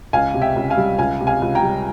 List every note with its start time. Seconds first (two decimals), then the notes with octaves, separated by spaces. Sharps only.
0.13 C#2 F5 G#5
0.34 C3
0.42 E5 G5
0.56 C#2
0.70 F5 G#5
0.77 G3
0.99 C#2 F5 G#5
1.21 C3
1.27 F5 G#5
1.42 C#2
1.55 G5 A#5
1.63 G3